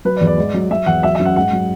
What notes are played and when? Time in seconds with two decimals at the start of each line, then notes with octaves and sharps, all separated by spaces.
0.05 F#3 B4
0.16 D5
0.21 E2
0.27 D5
0.38 G#2
0.54 F#3
0.71 F#3 E5
0.86 E2 F#5
1.03 F#3 E5
1.15 E5
1.19 F#2
1.25 F#5
1.36 G#2 F#5
1.53 F#3